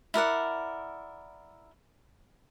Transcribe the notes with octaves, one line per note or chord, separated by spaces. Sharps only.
E4 A#4 D5 F#5